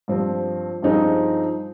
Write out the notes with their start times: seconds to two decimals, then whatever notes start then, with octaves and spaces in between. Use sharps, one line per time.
0.08 G2 F3 C4
0.83 G2 F3 C4 D#4 G#4